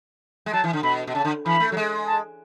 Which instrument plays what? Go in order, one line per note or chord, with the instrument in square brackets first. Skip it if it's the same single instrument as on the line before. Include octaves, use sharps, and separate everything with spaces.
[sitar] G#3
[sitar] F#3 [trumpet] A5
[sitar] E3
D3
[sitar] B2 [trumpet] B5
[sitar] B2
[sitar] C#3 [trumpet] A5
[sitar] D3
[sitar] E3 [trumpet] B5
[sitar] A3
F#3
G#3
[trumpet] A5